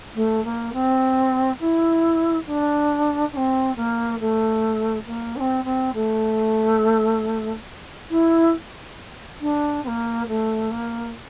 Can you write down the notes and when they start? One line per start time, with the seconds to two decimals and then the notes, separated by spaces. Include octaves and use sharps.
0.15 A3
0.44 A#3
0.73 C4
1.60 E4
2.47 D4
3.32 D4
3.37 C4
3.76 A#3
4.20 A3
5.07 A#3
5.36 D4
5.40 C4
5.64 C4
5.94 A3
8.10 E4
9.41 D4
9.84 C4
9.87 A#3
10.28 A3
10.70 A#3